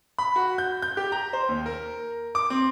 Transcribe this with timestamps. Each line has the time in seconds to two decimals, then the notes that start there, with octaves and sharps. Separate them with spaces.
0.18 B5
0.36 F#4
0.58 G6
0.82 G6
0.97 G4
1.12 A#5
1.33 C5
1.49 D#2
1.66 A#4
2.35 D6
2.50 C4